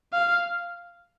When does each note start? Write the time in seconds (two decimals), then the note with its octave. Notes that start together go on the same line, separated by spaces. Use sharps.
0.13 F5